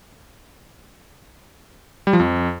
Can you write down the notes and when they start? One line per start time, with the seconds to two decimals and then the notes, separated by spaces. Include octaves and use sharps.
2.07 G3
2.13 F3
2.20 F2